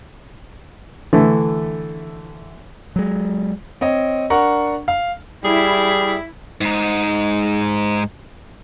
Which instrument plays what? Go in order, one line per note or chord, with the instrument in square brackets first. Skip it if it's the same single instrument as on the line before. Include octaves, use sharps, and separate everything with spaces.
[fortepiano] D3 E3 A3
[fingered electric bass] F#3 G#3
[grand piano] C4 C#5 D#5
D4 A#4 F#5 A#5 C#6
F5
[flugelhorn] G3 [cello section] E4 [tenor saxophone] G#4
[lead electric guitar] G#2 D#4